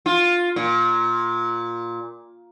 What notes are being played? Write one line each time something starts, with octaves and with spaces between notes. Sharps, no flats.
F4
A#2